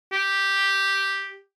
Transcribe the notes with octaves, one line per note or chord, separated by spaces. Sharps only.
G4